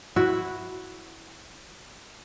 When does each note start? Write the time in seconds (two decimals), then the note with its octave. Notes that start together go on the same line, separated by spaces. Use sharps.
0.16 E4 F#4